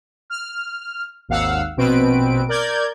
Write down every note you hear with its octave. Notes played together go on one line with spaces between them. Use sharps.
F6
G#1 D#2 F5 F#5 E6
A#1 B2 C4 B4 D7
A#4 D5 G6 G#6